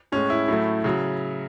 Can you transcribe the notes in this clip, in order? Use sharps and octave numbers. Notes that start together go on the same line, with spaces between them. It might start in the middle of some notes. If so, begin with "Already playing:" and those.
A2 G#3 C#4
E4
A2 F#3 A3
C#3 F#3